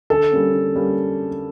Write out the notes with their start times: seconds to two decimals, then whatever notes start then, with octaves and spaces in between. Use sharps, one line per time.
0.10 D3 A4
0.32 G3 A#3 C#4
0.53 D3
0.75 G3 A#3 C#4